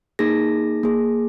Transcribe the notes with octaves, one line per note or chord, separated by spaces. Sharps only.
A#3 D#4 G#4 A#6
A#3 G#4